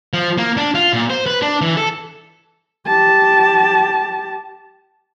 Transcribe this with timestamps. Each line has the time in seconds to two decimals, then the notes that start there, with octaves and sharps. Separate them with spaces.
0.14 F3
0.38 A#3
0.57 D4
0.75 F4
0.93 A#2
1.10 C5
1.26 B4
1.42 D4
1.61 E3
1.77 A4
2.87 G4 A5